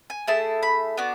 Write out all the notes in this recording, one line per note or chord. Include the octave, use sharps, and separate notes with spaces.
G#5
A3 E4 G#4 A5
B5
B3 D4 F#4 D6